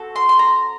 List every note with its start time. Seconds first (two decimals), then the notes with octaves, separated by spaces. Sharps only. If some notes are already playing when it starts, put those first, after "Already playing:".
Already playing: C4 F#4 A4
0.16 C6
0.29 C6
0.39 A#5